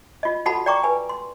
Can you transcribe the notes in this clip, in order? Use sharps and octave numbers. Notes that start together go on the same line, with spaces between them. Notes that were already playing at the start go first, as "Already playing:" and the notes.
F4 D#5
F4 F#4 A4 F#5 A5 B5
D5 G5 A#5 C#6 D6
B4 G#5
C6